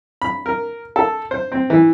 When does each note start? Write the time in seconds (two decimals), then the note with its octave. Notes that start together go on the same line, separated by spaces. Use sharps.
0.22 B5
0.46 A#4
0.96 A4
1.31 C5
1.52 C4
1.70 E3